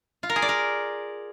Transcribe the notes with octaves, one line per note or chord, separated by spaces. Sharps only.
F4
A#4
G#4
D5
A#4